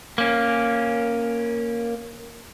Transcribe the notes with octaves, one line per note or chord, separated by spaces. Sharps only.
A#3 C#4